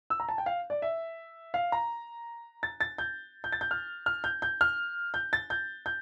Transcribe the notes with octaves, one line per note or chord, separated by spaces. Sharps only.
E6
A#5
A5
G5
F5
D5
E5
F5
A#5
A6
A6
G6
G6
A6
G6
F6
F6
G6
G6
F6
G6
A6
G6
G6